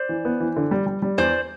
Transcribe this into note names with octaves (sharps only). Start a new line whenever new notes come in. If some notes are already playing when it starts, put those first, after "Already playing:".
Already playing: C5 D5
E3
B3
E3
D3
G3
G3
G3
E2 C5 D5